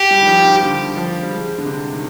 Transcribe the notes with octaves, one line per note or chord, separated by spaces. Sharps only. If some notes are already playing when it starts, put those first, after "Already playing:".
Already playing: G4
G3
D#3
F3
D#3
D3
F3
G3
G#3
D3
C3
D#3